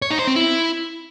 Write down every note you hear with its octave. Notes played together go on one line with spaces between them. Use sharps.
C#5
D#4
C5
C4
E4